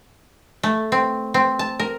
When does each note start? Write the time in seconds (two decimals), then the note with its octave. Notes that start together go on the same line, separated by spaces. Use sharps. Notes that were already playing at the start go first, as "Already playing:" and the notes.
0.63 A3
0.92 C4
1.34 C4
1.59 A5
1.80 A#4